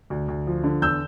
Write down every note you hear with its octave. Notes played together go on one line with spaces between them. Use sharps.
D2
D2
F3
D3
E2 E6 G6